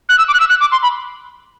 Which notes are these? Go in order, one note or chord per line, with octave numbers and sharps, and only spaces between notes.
F#6
E6
D6
F#6
E6
F#6
D6
C6
B5